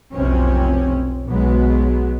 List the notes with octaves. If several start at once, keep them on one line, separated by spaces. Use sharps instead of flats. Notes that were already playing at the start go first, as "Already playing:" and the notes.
F1 B1 F2 C3 C4 C#4
B1 F#3 G#3 B3